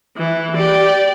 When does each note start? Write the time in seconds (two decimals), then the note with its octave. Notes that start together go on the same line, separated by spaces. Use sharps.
0.17 E3
0.54 G4 D5